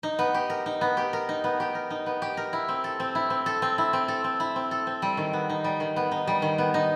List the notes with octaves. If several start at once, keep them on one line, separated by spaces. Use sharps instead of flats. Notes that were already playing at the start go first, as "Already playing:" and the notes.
D#4
B3
G4
A#4
D#4
B3
G4
A#4
D#4
B3
G4
A#4
D#4
B3
G4
A#4
E4
C4
A4
C4
E4
C4
A4
C4
E4
C4
A4
C4
E4
C4
A4
C4
G3
D#3
B3
D#4
G3
D#3
B3
D#4
G3
D#3
B3
D#4